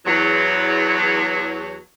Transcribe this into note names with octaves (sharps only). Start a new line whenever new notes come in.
E2 F#3